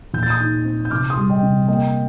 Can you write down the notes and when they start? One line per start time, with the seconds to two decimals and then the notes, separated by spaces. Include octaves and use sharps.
0.13 A#2 G6
0.23 A6
0.30 D#6 G6
0.40 D#4
0.65 C4
0.85 G6
0.91 C3 D6 F6
1.10 C6 D#6
1.17 G3
1.30 D#5 G5
1.43 C3
1.68 A#3 D#5 G5